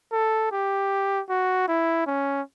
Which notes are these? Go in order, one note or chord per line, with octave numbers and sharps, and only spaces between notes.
A4
G4
F#4
E4
C#4